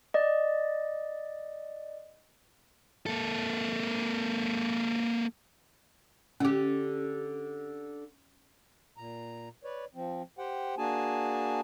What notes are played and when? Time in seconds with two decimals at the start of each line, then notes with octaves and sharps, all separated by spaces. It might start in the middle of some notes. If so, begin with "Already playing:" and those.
0.14 D5 D#5
3.06 A#3 A4
6.40 D3 C#4 G4
8.97 A#2 A#5
9.64 B4 C#5 D5
9.95 F3 C4
10.38 G4 C5 F#5 G5
10.78 A#3 D4 F#4 G#4 G#5 A5